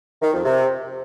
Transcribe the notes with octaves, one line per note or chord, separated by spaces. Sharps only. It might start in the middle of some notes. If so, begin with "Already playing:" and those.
D#3
F2
C3